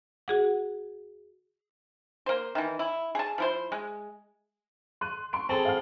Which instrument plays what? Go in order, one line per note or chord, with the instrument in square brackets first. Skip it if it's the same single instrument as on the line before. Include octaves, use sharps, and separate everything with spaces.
[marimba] F#4 G#4 F#5
[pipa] A#3 C5
D#3 E3
E4
G#4 A5
F3 E4 C5
G#3
[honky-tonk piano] C6 F#6 D#7
C6 C#6 D7
[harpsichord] C4 G#4 A4 [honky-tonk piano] A5 B5
[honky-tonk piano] F5 F#5 F6